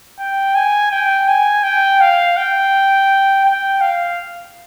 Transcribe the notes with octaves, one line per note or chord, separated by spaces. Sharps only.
G5
G#5
G5
G#5
G5
F5
G5
G5
F5